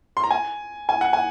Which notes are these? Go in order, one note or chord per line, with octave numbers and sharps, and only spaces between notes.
C6
A#5
G#5
G#5
F#5
G#5